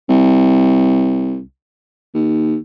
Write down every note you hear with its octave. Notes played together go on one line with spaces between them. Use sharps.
C2
D#2